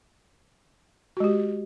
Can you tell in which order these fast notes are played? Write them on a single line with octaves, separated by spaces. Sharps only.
F#4 G#3 G4